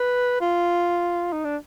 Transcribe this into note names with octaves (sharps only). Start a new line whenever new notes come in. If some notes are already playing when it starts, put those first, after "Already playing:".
Already playing: B4
F4
D#4
D4